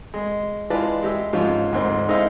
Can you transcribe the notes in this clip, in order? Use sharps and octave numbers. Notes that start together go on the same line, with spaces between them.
G#3
E3 G#3 F4 B4 D5 A5
G#3 G4 E5
G#2 F3 C#4 F4
D2 G#2 C4 C6
G#3 D#4 E4 C5 E5 F5